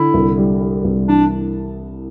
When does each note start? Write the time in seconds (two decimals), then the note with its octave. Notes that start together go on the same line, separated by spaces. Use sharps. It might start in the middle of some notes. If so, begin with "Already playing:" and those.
Already playing: D3 E4
0.14 C2
0.38 G3
0.61 G3
0.84 C2
1.07 E3 D4